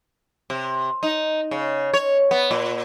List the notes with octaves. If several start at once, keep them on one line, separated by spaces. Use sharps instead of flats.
C3
D#4
C#3
C#5
B3
A#2